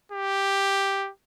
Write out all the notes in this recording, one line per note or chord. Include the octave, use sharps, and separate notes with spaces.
G4